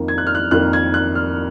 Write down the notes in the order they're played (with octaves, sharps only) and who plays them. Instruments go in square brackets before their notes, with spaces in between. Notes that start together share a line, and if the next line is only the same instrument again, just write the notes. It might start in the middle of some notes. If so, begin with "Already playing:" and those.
Already playing: [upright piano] F2 D#3 A#3
G#6
F#6
F6
F#6
F2 D#3 A#3 F#6
G#6
F#6
F6